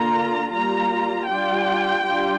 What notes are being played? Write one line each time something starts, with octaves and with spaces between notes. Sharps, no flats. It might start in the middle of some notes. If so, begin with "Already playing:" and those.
Already playing: D3 A#3 F4 A#5
G3 A#3 F4 A#5
G3 D4 F4 G5
G3 D4 F4